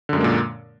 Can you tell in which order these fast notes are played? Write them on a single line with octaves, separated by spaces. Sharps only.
D3 F#2 G#3 A#3 A#2